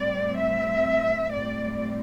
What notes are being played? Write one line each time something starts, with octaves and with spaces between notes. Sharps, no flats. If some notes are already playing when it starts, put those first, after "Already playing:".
Already playing: A2 G3 C4 D5
E5
A2 G3 C4 D5